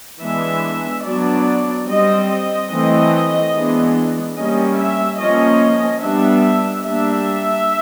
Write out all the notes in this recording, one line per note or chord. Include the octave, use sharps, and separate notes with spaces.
E3 G#3 B3 D4 E5
F#3 B3 D4 D5
G3 C4 D#5
D#5
E3 A3 C4
E3 G#3 B3 D4
G3 A#3 C#4 D#5
E5
F3 A#3 C#4 D#5
G3 B3 D4 E5
G3 A#3 D4 E5